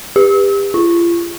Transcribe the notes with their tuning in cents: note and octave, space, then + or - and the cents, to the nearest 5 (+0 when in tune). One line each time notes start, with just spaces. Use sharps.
G4 +30
F4 -40